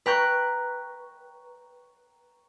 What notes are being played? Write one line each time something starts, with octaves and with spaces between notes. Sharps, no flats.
B4 G5 A#5 C#6 F#6 G6